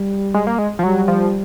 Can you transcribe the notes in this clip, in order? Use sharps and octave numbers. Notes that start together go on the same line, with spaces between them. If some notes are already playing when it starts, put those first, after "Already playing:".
Already playing: G3
G#3
A#3
G#3
F3
F#3 G3
F3